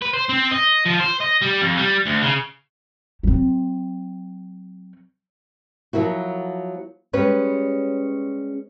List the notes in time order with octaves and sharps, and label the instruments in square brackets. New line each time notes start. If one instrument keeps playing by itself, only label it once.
[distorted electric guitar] B4
C5
C4
D#5
F3
C5
D#5
G3
F2
G3
D2
C#3
[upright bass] F#3 C4
[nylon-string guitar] F3 F#3 A#3 E4 F#4
G3 G#3 C#4 B4 C#5